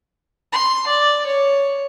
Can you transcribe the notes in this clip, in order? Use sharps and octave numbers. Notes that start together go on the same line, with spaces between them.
C6
D5
C#5